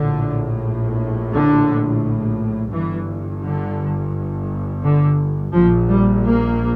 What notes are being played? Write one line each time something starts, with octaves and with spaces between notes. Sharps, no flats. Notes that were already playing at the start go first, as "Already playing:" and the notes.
Already playing: A#1 A2 D3
D3
G1 G2 E3
D3
D3
A#1 A#2 F3
G3
A#3